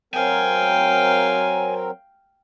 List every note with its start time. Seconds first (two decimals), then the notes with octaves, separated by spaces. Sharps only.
0.14 F#3 C4 A#4 F5 G5 G#5